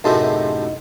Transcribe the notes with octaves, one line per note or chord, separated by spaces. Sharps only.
F#2 A2 C3 D#4 G#4 A5 C6